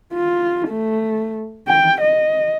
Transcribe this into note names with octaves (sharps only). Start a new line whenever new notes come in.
F4
A3
G5
D#5